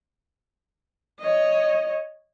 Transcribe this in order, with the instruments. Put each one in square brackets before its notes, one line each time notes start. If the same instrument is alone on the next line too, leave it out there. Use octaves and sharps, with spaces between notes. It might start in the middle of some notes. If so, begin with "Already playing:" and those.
[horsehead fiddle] C#5 D#5